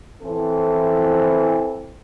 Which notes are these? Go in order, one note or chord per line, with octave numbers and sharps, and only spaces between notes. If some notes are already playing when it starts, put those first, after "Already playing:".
E3 C4 A4